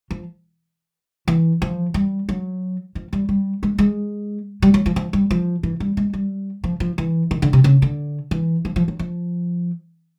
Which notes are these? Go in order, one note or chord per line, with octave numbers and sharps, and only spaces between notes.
F3
E3
F3
G3
F#3
F3
G3
G3
G#3
G#3
G3
F#3
F3
F3
G3
F3
E3
G3
G#3
G3
F3
F3
E3
D#3
D3
C3
C#3
D3
E3
F3
F3
F#3
F3